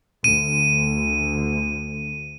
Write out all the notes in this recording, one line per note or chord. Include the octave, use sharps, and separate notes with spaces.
D2 D#7